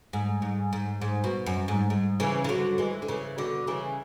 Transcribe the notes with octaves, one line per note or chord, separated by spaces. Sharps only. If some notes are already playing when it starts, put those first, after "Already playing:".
G#2
G#2
G#2
G#2
B2
F#2
G#2
G#2
C#3 E3
E3
D3 F#3
E3 G#3
D3
C#3 E3
B2 D3
C#3 E3